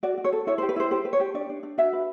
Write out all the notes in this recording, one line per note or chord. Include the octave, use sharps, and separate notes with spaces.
F#4 D5
F#4
C#5
A4
E4 C#5
C5
G4
B4
E4 C5
G4 C5
B4
C#5
G4
D4 D5
D4
D4
F#4 E5
B4